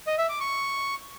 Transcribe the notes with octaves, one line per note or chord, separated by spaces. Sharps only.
D#5
E5
D6
C#6